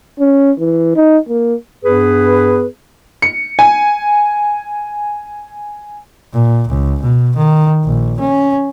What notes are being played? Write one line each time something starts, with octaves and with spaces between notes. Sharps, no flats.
C#4
E3
D#4
A#3
G2 B3 G#4 B4
C#7
G#5
A#2
C#2
B2
D#3
A#1
C#4